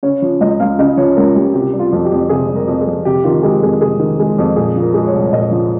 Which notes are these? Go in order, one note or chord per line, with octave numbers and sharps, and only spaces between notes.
C#3 C#5
F3
C#2 D#5
C#2 F5
C#3 D#5
F3 C#5
C#2 A#4
C#2 G4
C3 G4
G3
F4
F2
G4
F2
C3 G#4
G3
A#4
F2
G#4
F2
C3 G4
D#3 F4
G#3 G4
F2 G#4
C3 G#4
D#3
G#3
F2
A#2 G#4
F3
A#4
G#3
C#5
C2
A#2 D#5
F3